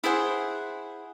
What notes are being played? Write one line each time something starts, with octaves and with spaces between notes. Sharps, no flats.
E4 G#4 C5 F#5